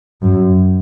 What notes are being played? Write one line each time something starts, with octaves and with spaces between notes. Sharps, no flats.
F#2